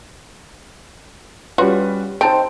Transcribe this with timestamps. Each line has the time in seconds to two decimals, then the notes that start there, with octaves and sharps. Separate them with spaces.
1.58 G3 C#4 F4 F#4 B4
2.21 C4 D#4 C5 A5 D7